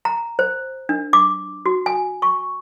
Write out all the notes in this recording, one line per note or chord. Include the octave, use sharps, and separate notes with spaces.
A#5
C5
D4
D6
F#4
G#5
C#6